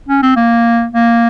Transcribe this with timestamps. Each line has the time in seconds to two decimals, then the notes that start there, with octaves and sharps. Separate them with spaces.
0.09 C#4
0.23 C4
0.36 A#3
0.93 A#3